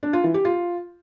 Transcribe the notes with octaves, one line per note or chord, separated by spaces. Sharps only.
D4
F4
E3
G4
F4